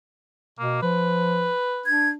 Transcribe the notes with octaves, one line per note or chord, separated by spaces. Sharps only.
B2 A#3
F3 B4
D4 G#6